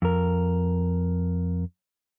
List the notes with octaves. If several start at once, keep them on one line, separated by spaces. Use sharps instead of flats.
F2 A#4